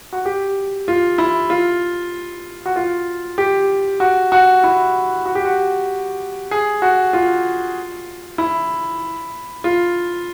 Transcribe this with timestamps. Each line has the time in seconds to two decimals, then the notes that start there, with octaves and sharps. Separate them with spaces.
0.13 F#4
0.25 G4
0.88 F4
1.18 E4
1.50 F4
2.66 F#4
2.76 F4
3.38 G4
4.00 F#4
4.32 F#4
4.63 E4
5.26 F#4
5.35 G4
5.45 F#4
6.51 G#4
6.82 F#4
7.13 F4
8.38 E4
9.64 F4